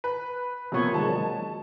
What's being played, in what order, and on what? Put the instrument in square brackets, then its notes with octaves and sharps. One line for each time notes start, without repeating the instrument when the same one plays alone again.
[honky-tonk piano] B4
[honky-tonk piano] C3 B3 [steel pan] F3 A#3 C#5
[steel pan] D#3 G#3 [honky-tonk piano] A5
[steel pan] F#3